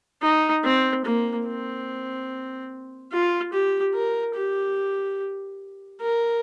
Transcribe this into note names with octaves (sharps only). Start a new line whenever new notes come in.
D#4
C4
A#3
C4
F4
G4
A#4
G4
A#4